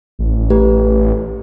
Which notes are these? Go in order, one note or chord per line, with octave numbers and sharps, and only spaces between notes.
A1
A3 G4 B4